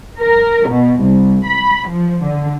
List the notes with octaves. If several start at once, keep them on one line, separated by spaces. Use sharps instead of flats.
A#4
B2
C2
B5
F3
D3